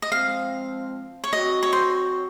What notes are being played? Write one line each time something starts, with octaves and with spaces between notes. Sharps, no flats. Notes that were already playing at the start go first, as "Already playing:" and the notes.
D#5
F3 G#3 C4 F5
C#5
F#3 C4 F#4 D#5
C#5
C5